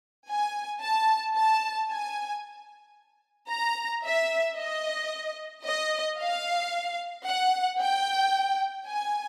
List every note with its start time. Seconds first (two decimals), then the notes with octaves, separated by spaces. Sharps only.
0.29 G#5
0.82 A5
1.36 A5
1.91 G#5
3.51 A#5
4.06 E5
4.59 D#5
5.66 D#5
6.21 F5
7.27 F#5
7.81 G5
8.89 G#5